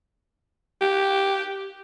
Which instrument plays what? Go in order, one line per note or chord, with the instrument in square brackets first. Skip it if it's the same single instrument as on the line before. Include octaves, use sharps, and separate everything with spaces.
[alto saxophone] G4